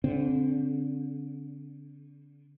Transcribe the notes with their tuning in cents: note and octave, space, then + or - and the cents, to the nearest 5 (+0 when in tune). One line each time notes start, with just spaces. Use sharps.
D3 -30 C4 +0